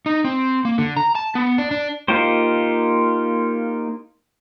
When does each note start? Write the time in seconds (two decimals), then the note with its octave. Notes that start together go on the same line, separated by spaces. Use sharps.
0.06 D#4
0.25 C4
0.65 A#3
0.78 D3
0.96 A#5
1.15 A5
1.35 B3
1.58 D4
1.71 D4
2.08 A#3 D#4 F4 G4 C5